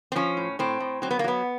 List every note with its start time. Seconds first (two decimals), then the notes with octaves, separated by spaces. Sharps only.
0.12 C4
0.15 F3 C#4
0.37 A2
0.59 A2 C4
0.80 A2
1.02 F#3 C4
1.11 B3
1.19 A#3
1.24 F#3 B3